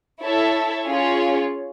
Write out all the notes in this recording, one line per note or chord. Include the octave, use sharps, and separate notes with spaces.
E4 A4 C#5 E5 A5
C#4 F4 G#4 C#5